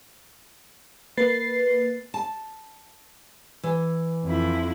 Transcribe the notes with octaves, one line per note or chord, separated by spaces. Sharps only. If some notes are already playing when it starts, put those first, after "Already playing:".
A#3 B4 A6 C7
A5
E3
F2 E4